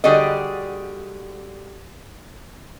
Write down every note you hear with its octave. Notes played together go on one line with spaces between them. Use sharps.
D3 G3 F#4 G#4 D5 D#5